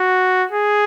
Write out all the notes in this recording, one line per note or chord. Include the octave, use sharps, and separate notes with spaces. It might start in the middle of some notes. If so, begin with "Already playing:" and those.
Already playing: F#4
G#4